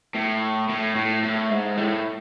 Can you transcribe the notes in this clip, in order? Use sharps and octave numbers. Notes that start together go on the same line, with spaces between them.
A2
A2
A2
A2
G#2
A2